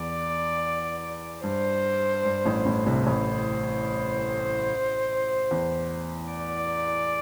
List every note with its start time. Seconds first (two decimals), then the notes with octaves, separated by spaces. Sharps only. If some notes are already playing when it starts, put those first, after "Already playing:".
Already playing: E2 D5
1.43 G2 C5
2.25 G2
2.45 A1 A2
2.66 A1 A2
2.86 C2 C3
3.06 A1 A2 C5
5.51 E2
6.32 D5